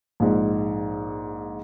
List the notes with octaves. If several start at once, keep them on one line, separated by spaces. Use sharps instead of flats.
A#1 G#2